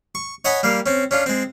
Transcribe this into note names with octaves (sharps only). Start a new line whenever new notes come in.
C#6
C#5 D#5 F#5 G#5 B5 D#6
G3 A#3 F5
C4 C#4
C#4 D4 F4
G#3 C4